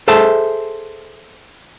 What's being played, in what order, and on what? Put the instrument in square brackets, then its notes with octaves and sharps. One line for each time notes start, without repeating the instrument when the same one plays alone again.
[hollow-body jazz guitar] G#4 A4 C5 E5 A5